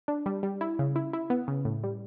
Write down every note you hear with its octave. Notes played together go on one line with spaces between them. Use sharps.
D4
G3
G3
E4
C#3
E4
E4
B3
C#3
A2
G3